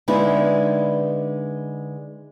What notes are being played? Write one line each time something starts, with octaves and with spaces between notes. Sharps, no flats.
D3 G#3 B3 D#4 E4